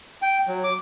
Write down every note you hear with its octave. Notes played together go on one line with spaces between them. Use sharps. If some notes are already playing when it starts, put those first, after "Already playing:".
G5
F#3
D6